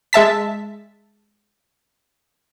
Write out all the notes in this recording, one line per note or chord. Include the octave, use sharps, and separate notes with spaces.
G#3 E5 A5 B6